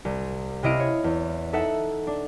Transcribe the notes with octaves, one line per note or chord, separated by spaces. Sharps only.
C2
C3 C#4 E4 D#5 F5 D7
C#5
E2
D#4 A4 E5 F#5
D4